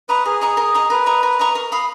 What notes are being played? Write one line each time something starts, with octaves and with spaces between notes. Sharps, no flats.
B4 D#5 A#5 C#6
G#4 A#4
D#5 A#5 C#6
A#4
D#5 A#5 C#6
A#4 B4
D#5 A#5 C#6
A#4
D#5 A#5 C#6
A#4
F5 B5 D#6